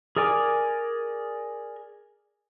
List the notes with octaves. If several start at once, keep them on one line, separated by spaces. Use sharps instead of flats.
G#4 A#4 D5 G#5 D6